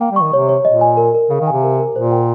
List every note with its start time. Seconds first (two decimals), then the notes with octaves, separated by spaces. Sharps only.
0.01 A#3 G5
0.12 G3
0.16 C#6
0.22 D#3
0.33 C3 C#5
0.49 C#5
0.65 A#2 D#5
0.81 G#5
0.97 A#4
1.14 A#4
1.30 C#3 F5
1.41 D#3
1.47 G#5
1.52 C3
1.63 A#4
1.80 A#4
1.95 A#2 C5
2.12 G5